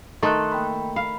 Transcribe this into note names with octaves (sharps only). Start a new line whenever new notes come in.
D#3 A3 A4 C6 D#6 F#6
A#3 G5 B5
F5 B5